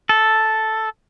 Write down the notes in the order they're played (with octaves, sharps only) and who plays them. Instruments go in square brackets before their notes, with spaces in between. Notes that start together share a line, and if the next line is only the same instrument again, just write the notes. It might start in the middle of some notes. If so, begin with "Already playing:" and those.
[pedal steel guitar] A4